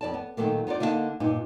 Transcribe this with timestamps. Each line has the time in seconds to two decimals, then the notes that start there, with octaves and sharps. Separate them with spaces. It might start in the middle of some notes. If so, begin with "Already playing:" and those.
0.01 F2 D5 A5
0.14 B3
0.37 A#2 D#3 F#3 A3 A#3
0.67 B3 D#4 F4 D5
0.80 D3 A#3 D#4 E5 F5 A5
1.20 G2 A#2 D#4